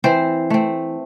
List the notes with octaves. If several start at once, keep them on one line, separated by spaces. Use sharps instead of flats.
E3 C4 C5
A3 C4